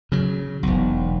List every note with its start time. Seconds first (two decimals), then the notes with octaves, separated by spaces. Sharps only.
0.12 C#3 F#3
0.63 E1 B1